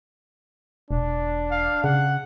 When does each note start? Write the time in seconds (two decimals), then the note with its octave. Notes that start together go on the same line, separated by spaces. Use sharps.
0.91 E1 D4
1.51 F5
1.84 C#3 F#5